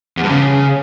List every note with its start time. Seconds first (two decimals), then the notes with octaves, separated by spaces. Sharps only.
0.17 E2
0.23 G2
0.29 C#3